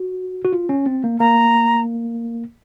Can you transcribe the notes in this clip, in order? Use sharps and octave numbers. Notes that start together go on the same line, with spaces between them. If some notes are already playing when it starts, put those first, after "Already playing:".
Already playing: F#4
F#4
F4
C#4
C4
A#3
A#3 A#5